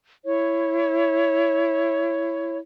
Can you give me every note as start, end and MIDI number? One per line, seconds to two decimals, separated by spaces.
0.25 2.57 64
0.25 2.57 73